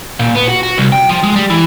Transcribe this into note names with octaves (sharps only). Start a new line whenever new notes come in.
A#2
B3
F#4
F#4
C2
G5
F3
G#3
G3
E3